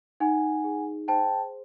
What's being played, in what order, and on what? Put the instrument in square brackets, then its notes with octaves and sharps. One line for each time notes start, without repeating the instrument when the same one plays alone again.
[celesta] D#4 F#5 G#5
G#4
C5 G5 A5